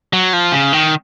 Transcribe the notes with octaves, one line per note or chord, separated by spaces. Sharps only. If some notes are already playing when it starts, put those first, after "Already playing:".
F#3
F3
C#3
D#3